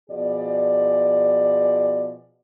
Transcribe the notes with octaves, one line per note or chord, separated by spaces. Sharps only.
B2 F3 G#4 D5